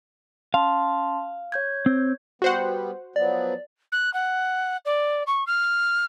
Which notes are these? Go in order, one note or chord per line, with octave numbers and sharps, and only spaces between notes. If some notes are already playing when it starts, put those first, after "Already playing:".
C#4 F5 A5 C6
C#5 G6 G#6
C4
G3 B3 F#4 C5 F#5
F3 F#3 B3 D5
F#6
F#5
D5
C#6
F6